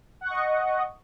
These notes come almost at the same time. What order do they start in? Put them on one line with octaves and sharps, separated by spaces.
F#5 C#6 D#5